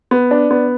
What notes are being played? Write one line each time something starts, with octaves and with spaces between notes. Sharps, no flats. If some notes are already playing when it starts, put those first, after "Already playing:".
B3
D4
B3